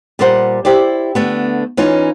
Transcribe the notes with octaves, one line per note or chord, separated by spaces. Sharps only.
A#2 G3 A#4 C5 F#5
E4 G4 C5 D5
D3 A3 B3
E3 C#4 D#4 F4